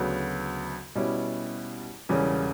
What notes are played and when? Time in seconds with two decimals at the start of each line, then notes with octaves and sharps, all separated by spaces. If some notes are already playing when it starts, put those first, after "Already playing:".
Already playing: D2 C#3 F#3 B3
0.95 B2 G3 C#4 E4 G4
2.09 E1 E2 C#3 G3 C#4